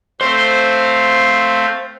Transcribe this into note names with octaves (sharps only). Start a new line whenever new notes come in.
A3 C4 C5 F5